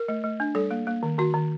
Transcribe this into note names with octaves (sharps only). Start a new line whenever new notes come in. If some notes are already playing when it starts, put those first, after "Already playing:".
Already playing: A#4
A3
A3
D4
G3 A4
A#3
A#3
D#3
D#3 F#4
D#3